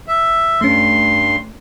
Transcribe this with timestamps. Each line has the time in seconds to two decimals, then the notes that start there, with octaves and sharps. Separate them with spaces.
0.08 E5
0.61 G2 A3 C#4 C6